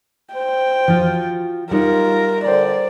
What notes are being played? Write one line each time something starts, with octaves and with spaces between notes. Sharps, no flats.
C5 G5
F3 F4 F#4
G3 D#4 F4 G4 A#4 D#5 F#5
D3 C5 D5 G5 A#5